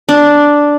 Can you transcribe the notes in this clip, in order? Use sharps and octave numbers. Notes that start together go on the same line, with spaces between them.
D4